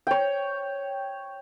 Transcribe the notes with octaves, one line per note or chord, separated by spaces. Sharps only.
C#5 G5